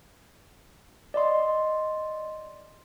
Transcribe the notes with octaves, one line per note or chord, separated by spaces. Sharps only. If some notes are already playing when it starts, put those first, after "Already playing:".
D5 D#5 C6